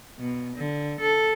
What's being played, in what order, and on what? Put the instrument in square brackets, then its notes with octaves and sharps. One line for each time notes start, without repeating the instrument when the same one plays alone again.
[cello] B2
D3
A4